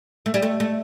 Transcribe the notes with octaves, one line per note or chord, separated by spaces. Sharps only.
A3
G3
A3
A3